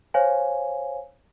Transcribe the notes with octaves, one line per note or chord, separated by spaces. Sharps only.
C5 C#5 F5 G#5